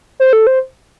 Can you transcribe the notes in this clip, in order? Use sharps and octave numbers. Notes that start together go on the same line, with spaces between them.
C5
A4
C5